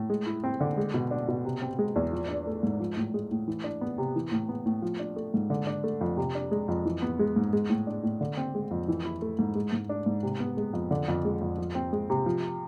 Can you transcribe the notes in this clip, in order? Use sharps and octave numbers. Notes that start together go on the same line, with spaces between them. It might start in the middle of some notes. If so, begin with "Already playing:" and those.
Already playing: A2
G#3
E4
C4
D3
G#3
B2
D4
B2
C3
C4
G#3
E2
F3
D4
A3
G#2
F3
A2
G#3
A2
E3
D4
B3
C3
E3
A2
B3
A2
F3
D4
A3
G#2
D3
D4
A3
F2
C3
D4
G#3
F2
E3
B3
G#3
G#2
G#3
A2
D4
A2
D3
C4
G#3
F2
E3
E4
A3
G#2
G#3
G#2
D4
G#2
C3
B3
G#3
F2
D3
F2
G#3
F2
F3
C4
G#3
C3
F3